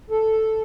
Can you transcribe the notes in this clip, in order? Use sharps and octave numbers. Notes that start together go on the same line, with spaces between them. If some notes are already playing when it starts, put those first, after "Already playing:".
A4